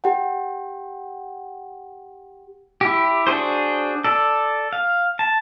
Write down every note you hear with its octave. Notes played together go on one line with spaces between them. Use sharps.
G4 F#5 G5
E4 G4
D4 F#4 G#4 C5
A4 D5
F5
A5